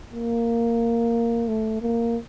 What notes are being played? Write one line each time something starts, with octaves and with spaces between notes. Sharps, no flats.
A#3
A3
A#3